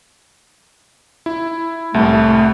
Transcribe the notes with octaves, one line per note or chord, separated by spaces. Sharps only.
E4
C2 A2 A3